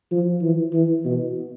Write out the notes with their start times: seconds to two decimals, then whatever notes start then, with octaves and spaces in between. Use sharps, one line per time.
0.11 F3
0.42 E3
0.73 E3
1.05 B2